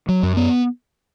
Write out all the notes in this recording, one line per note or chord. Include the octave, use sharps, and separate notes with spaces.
F#3
F#2
B3